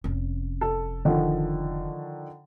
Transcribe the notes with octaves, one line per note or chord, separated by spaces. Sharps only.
F1 C#4
A4
D3 D#3 F3